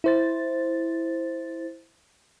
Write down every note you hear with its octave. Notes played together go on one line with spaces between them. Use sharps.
E4 C5 A6